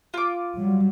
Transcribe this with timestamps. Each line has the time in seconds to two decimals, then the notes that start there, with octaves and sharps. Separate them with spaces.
0.14 F4 D6
0.56 F#3 G3